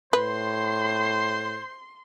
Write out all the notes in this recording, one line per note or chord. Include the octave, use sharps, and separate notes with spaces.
A2 B4 C5 C6